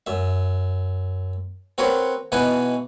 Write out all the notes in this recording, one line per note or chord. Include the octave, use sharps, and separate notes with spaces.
F#2 E5
C4 F#4 A#4 B4 C#5
B2 E3 D#4 F#4 B4 G#5